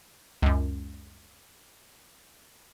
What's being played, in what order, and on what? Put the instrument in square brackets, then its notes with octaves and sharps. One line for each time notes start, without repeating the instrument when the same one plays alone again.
[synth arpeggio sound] C#2 F#2